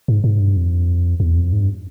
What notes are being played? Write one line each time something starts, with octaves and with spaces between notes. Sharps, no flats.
G#2
G#2
G2
F2
E2
F2
G#2
G2